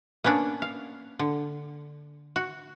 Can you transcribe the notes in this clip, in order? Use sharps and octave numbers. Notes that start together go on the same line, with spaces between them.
A#3 B3 C#4 D4
F5
D3
F#4